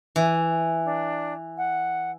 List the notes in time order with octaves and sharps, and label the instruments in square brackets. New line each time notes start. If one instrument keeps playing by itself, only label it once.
[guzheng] E3
[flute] D4
F#5